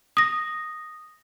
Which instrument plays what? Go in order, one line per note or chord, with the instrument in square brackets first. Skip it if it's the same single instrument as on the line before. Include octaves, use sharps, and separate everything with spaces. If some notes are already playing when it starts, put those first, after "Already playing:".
[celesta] D#6 A#6